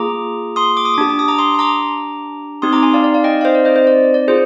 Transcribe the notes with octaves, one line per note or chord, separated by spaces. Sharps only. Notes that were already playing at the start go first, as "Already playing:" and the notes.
Already playing: A#3 F4 G#4 A#5 D6
C6 D#6
D6
D#6
D6
D4 G4 D#6
D6
D#6
A#5 D6
C6 D#6
C6
A#5 D6
C4 D#4 G4 C6 D#6
A#5 D6
G#5 C6
D5 F5
D5
D5 F5
D#5 G5
F5
C5 D#5
D5
C5 D#5
C5 D#5
D5
D5
F4 G#4 C5